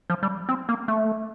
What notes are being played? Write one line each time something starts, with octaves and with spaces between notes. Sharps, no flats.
F3
G3
C4
A#3
A3